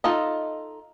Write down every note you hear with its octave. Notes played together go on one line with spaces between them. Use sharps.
D#4 F4 A4 D#5